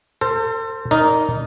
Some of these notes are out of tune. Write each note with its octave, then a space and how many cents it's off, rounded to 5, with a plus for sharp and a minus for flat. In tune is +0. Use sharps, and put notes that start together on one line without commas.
A4 +40 C5 +0
D#4 +0 A#4 +0 D5 -25